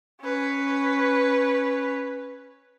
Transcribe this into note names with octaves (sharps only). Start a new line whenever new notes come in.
C#4 B4